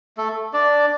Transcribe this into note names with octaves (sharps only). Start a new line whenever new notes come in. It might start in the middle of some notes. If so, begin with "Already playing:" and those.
A3 A4
D4 D5